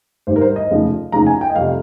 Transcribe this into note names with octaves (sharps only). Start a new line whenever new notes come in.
G#1 G2 D#3 G3 C5
A#4
C5
D#5
F1 D#2 C#3 F3
F1 D#2 C#3 F3 A#5
G#5
G5
D#5
F2 C3 G3 F5